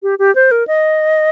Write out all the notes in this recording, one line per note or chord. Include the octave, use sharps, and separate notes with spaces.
G4
G4
C5
A#4
D#5